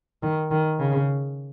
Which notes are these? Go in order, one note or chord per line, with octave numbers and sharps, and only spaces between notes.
D#3
D#3
C#3